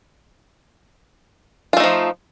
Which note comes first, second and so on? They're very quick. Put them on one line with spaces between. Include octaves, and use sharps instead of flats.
F4 A3 D#4 F3